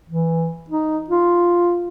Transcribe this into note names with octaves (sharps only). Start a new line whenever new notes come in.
E3
D#4
F4